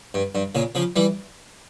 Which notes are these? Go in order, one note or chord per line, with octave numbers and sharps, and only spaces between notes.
G2
G2
A#2 C#3
C#3 F3
E3 G3